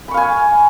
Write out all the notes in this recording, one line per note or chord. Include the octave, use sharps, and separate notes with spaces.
F5 G#5 B5 C#6